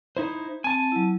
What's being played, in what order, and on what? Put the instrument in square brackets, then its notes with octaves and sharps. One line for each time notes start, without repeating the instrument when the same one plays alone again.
[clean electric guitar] D#4 E4 C5
[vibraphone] C4 [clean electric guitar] G#5 A5
[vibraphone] F#3 E4